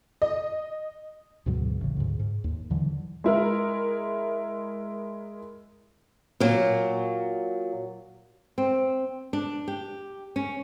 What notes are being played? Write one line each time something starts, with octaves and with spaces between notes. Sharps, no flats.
D#5
D2 G#2 B2 F#3
A1 C#3
D2 G#2
G#2
D#2
D#2 D3 E3 F#3
G#3 E4 A#4
A#2 F#3
C4
D4
G4
C#4